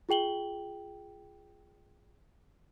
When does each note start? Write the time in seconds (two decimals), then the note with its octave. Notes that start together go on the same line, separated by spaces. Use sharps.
0.09 F4 G#4 G5 F#7 G7